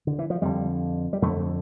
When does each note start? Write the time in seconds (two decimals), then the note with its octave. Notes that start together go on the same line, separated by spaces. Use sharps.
0.07 D3
0.19 E3
0.30 F3
0.42 F2 D3 G3
1.13 G3
1.22 F2 D3 A3